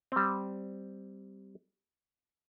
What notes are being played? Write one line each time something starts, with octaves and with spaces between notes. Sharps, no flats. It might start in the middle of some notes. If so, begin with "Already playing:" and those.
G3 C4